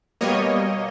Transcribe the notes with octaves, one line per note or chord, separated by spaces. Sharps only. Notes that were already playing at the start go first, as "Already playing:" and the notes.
B2 G3 A#3 C#5 D#5